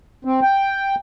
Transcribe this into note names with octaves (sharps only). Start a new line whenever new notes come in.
C4
G5